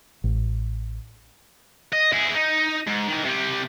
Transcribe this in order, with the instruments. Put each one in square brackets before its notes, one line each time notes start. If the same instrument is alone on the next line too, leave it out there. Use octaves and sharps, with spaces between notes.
[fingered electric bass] A1
[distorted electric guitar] D#5
E4 G#4
D#4
G#2
D#3 E3
C3 G3